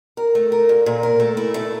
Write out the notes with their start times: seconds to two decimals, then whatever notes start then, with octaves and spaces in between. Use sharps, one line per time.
0.17 A#4
0.35 A3
0.52 A#4
0.69 A#2
0.86 A#2
1.03 A#4
1.20 A3
1.37 E4
1.54 A3